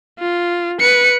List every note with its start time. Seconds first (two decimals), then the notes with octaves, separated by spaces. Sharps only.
0.19 F4
0.80 B4 C#7